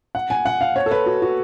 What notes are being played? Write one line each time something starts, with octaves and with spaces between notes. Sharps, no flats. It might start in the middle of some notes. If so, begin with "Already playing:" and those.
F#5
G#5
F#5
F5
C#5
A4
B4
F#4
F#4